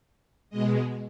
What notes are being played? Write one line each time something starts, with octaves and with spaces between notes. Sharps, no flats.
B2 G#3 D#5